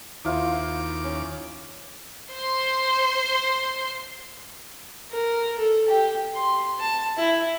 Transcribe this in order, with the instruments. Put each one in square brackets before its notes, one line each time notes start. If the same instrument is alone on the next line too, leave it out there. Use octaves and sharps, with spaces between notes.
[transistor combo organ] D#2 D6 [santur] E4 F4 C5
[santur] C#4
[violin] C5 C6
[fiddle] A#4
A4
G4
C6
A5
E4